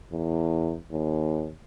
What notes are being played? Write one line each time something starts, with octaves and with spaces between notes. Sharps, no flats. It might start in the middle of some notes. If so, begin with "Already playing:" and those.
E2
D#2